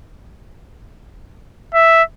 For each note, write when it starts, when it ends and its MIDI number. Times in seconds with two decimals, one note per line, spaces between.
1.74 2.03 76